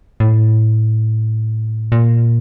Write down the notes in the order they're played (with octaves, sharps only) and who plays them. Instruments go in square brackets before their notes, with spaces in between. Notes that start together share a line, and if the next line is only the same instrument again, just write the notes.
[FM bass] A2
A#2